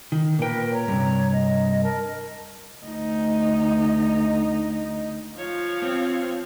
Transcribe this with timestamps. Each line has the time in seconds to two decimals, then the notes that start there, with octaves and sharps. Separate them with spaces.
0.12 D#3
0.39 A#2 A#4 B4 G5
0.71 C#5 A#5
0.88 G2 C3
1.31 D#5
1.82 A#4 A5
2.85 D2 D#4
5.38 F3 C#5 F5
5.82 C4